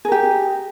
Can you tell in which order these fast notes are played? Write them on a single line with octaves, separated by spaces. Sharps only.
G#4 A#4 G4